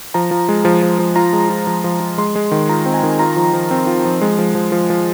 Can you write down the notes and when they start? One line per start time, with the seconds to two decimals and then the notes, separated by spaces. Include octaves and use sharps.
0.14 F3 A#5
0.31 F3
0.49 G#3
0.65 F3
0.82 F3
0.99 F3
1.16 F4 A#5
1.33 G#3
1.49 F4
1.67 F3
1.84 F3
2.00 F3
2.18 G#3 C6
2.35 G#3
2.51 D#3
2.69 F4 A#5
2.86 C4
2.94 G#5
3.03 D#3
3.19 F4 A#5
3.36 F3
3.53 F3
3.71 C4
3.87 F4
4.05 F3
4.21 G#3
4.38 F3
4.55 F3
4.72 F3
4.90 F3